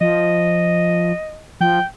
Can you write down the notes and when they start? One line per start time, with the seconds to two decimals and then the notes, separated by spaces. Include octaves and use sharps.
0.01 F3 D#5
1.61 F3 G5